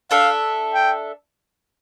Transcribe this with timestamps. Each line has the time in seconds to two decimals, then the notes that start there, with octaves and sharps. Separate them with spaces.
0.11 D4 A4 E5 F5
0.74 G5